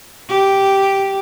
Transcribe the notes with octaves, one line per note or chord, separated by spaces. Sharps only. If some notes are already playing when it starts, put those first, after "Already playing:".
G4